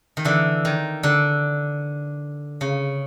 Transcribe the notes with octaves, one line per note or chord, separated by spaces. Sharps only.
D#3
D3 E3
D#3
D3
C#3